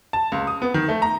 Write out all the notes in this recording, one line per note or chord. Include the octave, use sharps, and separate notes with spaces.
A5
C#2
D#6
B3
D#3
A3
A#5